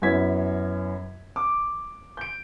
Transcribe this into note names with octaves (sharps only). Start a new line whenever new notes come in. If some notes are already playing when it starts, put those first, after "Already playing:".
F#2 B3 C#4 E4 G#6 B6
D6
G6 D7